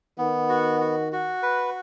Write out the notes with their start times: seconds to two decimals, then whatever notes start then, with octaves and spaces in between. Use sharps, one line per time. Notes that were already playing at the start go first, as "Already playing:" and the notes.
0.18 D#3 B3
0.49 F#4
0.81 F#4
1.12 F#4
1.43 B4